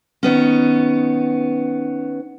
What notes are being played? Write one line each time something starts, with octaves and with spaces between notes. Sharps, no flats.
D#3 B3 C#4